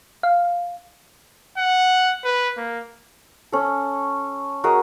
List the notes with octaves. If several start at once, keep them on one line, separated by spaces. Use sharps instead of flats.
F5
F#5
B4
A#3
C#4 A4
F#4 G#4 A#4 D#5